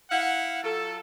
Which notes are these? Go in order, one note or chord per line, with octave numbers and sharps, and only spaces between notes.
E4 F5 F#5
F#3 F4 A4